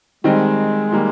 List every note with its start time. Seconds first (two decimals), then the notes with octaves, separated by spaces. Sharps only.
0.24 D#3 G3 G#3 C4 D#4
0.92 D#3 G3 A#3